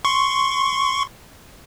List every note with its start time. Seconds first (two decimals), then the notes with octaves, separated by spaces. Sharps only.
0.05 C6 C#6